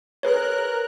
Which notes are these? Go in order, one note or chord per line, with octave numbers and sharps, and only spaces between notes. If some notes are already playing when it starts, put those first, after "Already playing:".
G#4 A#4 B4 C#5 F#6